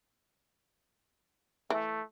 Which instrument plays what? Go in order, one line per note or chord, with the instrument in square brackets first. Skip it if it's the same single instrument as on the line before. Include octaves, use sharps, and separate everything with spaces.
[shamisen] E3 [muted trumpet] A3